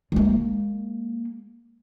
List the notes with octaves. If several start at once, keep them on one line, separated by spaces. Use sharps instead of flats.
G#3 A#3